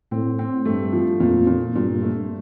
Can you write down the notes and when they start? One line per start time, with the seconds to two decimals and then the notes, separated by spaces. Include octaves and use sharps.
0.11 A2 C4
0.39 C4
0.65 G2 A3
0.93 F3
1.20 F2 A#2
1.47 A#2
1.75 G2 A#2
2.02 A3